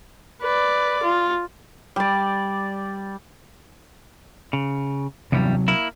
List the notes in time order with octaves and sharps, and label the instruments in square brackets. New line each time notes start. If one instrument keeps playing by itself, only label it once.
[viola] B4 D5
F4
[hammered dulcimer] G3 D5
[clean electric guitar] C#3
[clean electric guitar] E2 G2 G3 [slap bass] C3 F#3
[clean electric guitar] A#3 E4